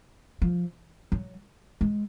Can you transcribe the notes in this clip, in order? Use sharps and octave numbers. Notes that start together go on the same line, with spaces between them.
F3
F#3
G#3